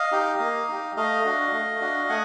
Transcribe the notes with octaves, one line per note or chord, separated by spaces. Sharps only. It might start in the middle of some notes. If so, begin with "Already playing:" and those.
Already playing: D#5 F5
D#4 G4
A#3
D#4 G4
A3 D#5 F5
D4 F#4
A3
D4 F#4
A3 F#5 G#5